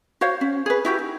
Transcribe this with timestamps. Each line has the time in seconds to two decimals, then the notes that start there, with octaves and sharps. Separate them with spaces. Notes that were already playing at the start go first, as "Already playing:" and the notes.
0.21 F#4 C5 C#5 F5
0.41 C#4
0.66 G#4 B4
0.85 E4 F#4 G4
0.99 D#4